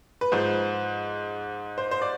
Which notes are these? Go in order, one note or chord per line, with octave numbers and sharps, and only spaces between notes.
B4
G#2 F3 C5
C5
C5
D5